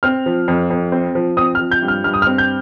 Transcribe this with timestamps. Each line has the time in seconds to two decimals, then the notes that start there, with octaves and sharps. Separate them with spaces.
0.03 C4 F6
0.26 F3
0.48 F2
0.70 F2
0.92 C4
1.15 F3
1.37 C4 D#6
1.55 F3 F6
1.71 G6
1.82 G2
1.88 F6
2.04 G2 F6
2.14 D#6
2.22 C4 F6
2.38 G6